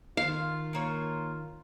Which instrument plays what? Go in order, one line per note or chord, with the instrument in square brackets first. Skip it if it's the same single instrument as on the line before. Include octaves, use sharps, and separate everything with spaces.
[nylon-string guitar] D#3 [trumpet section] F4 [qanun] F5
[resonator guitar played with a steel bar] A#2 A#3 C#5